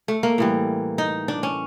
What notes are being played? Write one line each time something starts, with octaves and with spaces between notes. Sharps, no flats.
A3
A#3
A2 E3 G3
D#4
D4
C#4